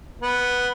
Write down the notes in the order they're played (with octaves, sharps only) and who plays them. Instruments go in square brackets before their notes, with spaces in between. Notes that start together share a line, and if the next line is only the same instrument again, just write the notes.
[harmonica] B3